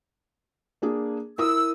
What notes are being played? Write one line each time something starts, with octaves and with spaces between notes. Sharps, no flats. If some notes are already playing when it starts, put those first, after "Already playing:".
A#3 D4 G#4
E4 A#4 D#6 E6